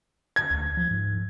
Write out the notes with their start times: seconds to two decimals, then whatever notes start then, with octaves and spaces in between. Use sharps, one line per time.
0.36 G#6
0.50 D2
0.77 F3
0.91 G#2